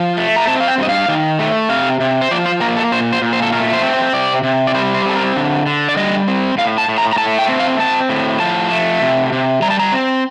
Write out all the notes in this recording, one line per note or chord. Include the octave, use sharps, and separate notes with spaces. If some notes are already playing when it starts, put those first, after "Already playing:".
Already playing: F3
A3
A#5
C4 A5
F5
G5
G2 D#5
F5
D#3
A3
C3 F5
C3
C5
F3 D5
C5
A#3 A#4
A4
A#2 C5
C5
A#2
C5
A4
A3 A#4
C5
C4
C5
C3 D5
C3
D5
G3 C5
C5
C4 A4
A#4
D3
D3
D5
G3 D#5
C4
A2 F5
A5
A2
A#5
A#5
A3 A5
G5
C4
F5
C4 A5
A2
F3 A5
A3
C3
C3
G3 A#5
A5
A#5
C4